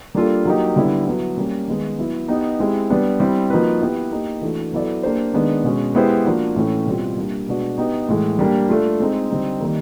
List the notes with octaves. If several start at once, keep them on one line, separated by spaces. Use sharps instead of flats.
G3 A#3 D4 F4 A4
F#3 A#3 D#4 G4
D3 G3 B3 E4
F#3 B3 E4
G3 A#3 C#4
D#3 G#3 B3
F#3 B3 E4
B3 D#4 G4 B4 D#5
G#3 C4 E4 G4
G3 B3 D4
G3 C4 E4
F3 A#3 D#4 F#4 B4
B3 E4 G4 B4
A#3 D#4 G4
E3 A3 D4 F#4
F#3 B3 E4 A4 D5
A#3 D4 G4 C5
D#3 G#3 B3 D4
B2 G#3 C#4
G#3 B3 E4 G4 C5
F3 A#3 D4 F#4
A2 E3 A3 C#4 E4
B2 G3 C4 F4
G3 A#3 D4
B2 G#3 B3 D4 F#4
B3 D#4 G4
A2 E3 G#3
G3 A#3 D4 G4
A3 D4 F4
G#3 C4 D#4
D3 G3 C4 D#4
D#3 G3 A#3